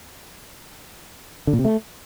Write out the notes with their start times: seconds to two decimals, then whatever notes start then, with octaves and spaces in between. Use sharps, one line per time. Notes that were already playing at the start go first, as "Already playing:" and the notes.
1.47 D3
1.53 A#2
1.59 C3
1.65 A3